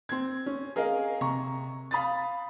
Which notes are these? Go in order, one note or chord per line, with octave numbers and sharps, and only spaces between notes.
C4 G#6
C#4
G#4 A#4 D#5 F5
C3 A#5 C#6
F5 B5 D#6 A6